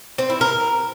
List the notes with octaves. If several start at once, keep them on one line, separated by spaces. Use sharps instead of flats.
C4
E4
A#4